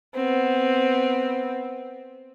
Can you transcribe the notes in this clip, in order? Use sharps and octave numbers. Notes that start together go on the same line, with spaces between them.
B3 C4